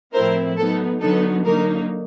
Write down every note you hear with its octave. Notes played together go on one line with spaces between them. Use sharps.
A2 F3 A3 C4 E4 A#4 C5
F#3 B3 D#4 A4
D3 F#3 B3 D#4 A4
D3 F#3 A#3 D#4 A#4